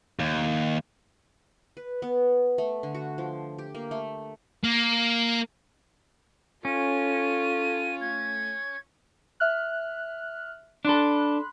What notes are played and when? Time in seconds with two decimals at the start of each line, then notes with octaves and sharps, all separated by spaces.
0.20 D#2
1.77 B4
2.02 B3
2.58 A3
2.83 D3
2.94 F#4
3.18 F3
3.58 G4
3.75 A#3
3.91 A3
4.64 A#3
6.65 C#4 F4 A4 D#7
8.01 A3 G#6
9.40 E5 F6 F#6
10.85 D4 A4 B5 C6 F#6